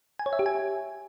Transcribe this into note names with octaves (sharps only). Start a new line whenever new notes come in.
G#5
C#5
E5
G4
G#5